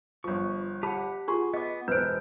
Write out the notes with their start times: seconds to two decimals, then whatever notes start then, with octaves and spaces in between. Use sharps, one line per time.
0.24 G1 F3 C#6
0.83 G4 F#5 A5 B5
1.28 F4 G#4 C6 C#6
1.54 B3 D#5 D6
1.88 E1 B4 C5 G6 D7